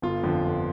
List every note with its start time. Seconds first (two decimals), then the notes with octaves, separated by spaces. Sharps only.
0.02 G1 F4
0.23 F2 D3 F3
0.43 G1